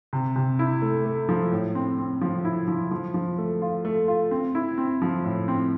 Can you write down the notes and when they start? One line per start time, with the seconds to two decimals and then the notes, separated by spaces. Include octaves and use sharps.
0.13 C3
0.36 C3
0.59 E4
0.82 A3
1.05 A3
1.29 F3
1.52 A2
1.75 C4
1.98 C4
2.21 F3
2.45 E4
2.68 F3
2.91 F3
3.14 F3
3.38 A3
3.62 F4
3.85 A3
4.08 F4
4.31 C4
4.55 E4
4.78 C4
5.02 F3
5.24 A2
5.48 C4